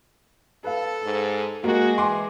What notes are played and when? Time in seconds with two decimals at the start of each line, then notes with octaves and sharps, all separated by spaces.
0.64 A4 B4 F5
1.03 G#2
1.64 G#3 A#3 F#4
1.98 E3 G#5 C6 D6